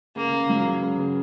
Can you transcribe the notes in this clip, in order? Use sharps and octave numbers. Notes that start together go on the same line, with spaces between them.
C#3 A#3
C#3
F#3
C#3
C#3
C#3